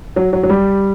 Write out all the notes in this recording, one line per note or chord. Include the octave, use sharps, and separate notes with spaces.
F#3
F#3
F#3
G3